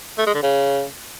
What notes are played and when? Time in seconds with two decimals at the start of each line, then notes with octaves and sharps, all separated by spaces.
0.18 A3
0.26 G#3
0.34 D3
0.43 C#3